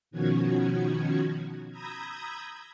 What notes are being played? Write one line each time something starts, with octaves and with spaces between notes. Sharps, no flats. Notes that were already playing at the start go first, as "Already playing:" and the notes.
B2 D#3 F3 C#4 F#4 G#6
A#5 B5 D#6 E6 G6 G#6